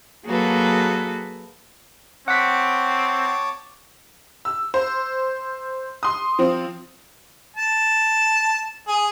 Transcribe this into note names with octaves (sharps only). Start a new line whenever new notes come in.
F#3 A#3 F#4 G#4 A4 B4
C4 C#5 F#5 A5 D6 B6
E6
C5
C6 D#6
F3 C4
A5
G#4